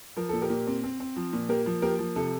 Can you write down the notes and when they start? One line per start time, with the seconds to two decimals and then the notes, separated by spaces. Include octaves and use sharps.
0.17 F3 A#4
0.29 A#2 A4
0.42 G4 A#4
0.50 A#2
0.67 C4
0.84 C4
1.00 C4
1.16 F3
1.33 A#2
1.49 A#3 G4 A#4
1.66 F3
1.82 A#3 G4 A#4
1.99 F3
2.16 C3 A4